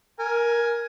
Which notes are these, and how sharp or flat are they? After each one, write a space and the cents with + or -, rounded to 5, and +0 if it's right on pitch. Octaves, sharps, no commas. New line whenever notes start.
A#4 +15 G#5 +5